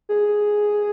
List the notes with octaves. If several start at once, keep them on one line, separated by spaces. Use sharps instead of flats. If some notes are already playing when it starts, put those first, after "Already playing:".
G#4